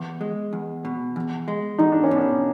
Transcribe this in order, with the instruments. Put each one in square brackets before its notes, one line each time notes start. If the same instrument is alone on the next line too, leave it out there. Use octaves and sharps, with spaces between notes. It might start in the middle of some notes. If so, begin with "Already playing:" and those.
Already playing: [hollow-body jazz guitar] E2
G#3
E2
B2
E2
G#3
[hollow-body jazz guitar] E2 [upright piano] D#4
[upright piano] D4
C#4
[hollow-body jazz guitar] B2
[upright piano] D4